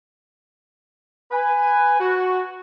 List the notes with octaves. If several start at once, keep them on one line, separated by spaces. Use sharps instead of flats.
B4 G#5
F#4